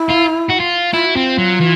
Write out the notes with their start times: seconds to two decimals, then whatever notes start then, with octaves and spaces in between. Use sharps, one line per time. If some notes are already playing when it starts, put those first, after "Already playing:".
Already playing: E4
0.09 F4
0.49 F#4
0.59 F4
0.93 E4 F4
1.05 F#4
1.16 C4 F4
1.38 F#3
1.60 E3